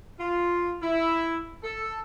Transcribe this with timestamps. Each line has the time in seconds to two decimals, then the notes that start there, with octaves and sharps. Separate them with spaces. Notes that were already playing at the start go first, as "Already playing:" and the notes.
0.19 F4
0.82 E4
1.64 A4